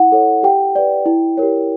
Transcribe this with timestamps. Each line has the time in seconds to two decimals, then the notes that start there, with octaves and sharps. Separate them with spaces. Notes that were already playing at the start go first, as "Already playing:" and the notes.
Already playing: E4 F#5
0.12 A4 C#5
0.43 G4 G5
0.75 B4 D5
1.06 E4
1.37 G4 A#4 C#5